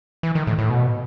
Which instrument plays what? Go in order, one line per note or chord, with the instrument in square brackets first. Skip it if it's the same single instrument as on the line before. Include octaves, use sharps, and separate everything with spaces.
[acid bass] E3
D#3
A2
A2
B2